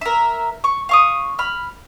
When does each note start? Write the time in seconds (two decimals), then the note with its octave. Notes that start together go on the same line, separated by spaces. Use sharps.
0.01 A#4 E5
0.64 C#6
0.89 F5 C#6 D#6
1.39 B5 F6